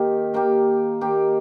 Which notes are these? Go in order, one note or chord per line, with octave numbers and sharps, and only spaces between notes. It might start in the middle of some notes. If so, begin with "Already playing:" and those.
Already playing: D#3 A#3 G4
D#3 A#3 G4
D#3 A#3 G4